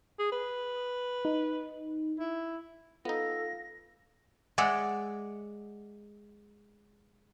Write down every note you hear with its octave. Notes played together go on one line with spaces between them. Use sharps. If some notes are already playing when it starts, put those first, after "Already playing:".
G#4
B4
D#4
E4
B3 D#4 F4 A4 F5 A#6
G#3 D5 E5 F#5